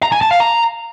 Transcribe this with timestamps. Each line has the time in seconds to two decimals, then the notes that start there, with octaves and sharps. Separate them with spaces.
0.03 A#5
0.12 G#5
0.21 A5
0.31 F5
0.40 A#5